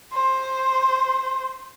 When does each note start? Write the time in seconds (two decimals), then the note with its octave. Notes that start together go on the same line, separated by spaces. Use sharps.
0.13 C5